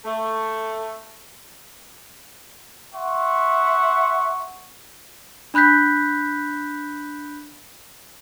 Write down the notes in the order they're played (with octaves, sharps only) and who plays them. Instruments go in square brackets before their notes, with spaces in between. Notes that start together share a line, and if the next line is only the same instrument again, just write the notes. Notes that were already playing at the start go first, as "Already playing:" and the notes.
[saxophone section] A3
[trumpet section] E5 F#5 C6 C#6
[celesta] D4 B5 F#6 G6 B6